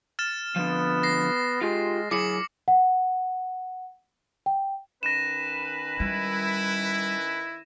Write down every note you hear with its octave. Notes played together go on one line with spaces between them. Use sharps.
F6 A6 E7
D3 F3 B3
A#6 C7
G#3 F4 G4
F#3 E4 G#4 D6 C#7 F#7
F#5
G5
D#3 C#4 B4 A#6 D#7 E7
G3 E4